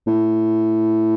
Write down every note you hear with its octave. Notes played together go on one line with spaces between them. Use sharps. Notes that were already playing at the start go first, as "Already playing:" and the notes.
A2